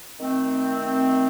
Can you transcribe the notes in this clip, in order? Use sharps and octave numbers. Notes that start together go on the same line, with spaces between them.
D#3 A3 C4